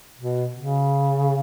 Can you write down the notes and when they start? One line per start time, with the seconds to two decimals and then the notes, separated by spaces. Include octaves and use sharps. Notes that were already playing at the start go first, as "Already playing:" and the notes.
0.18 B2
0.56 C#3